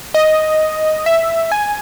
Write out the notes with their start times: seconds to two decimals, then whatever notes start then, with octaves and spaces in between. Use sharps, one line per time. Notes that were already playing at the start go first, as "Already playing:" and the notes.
0.14 D#5
1.06 E5
1.52 G#5